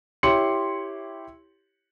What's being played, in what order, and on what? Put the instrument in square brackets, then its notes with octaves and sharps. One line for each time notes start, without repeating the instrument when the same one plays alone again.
[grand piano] E4 G4 C#5 C6 C#7 F#7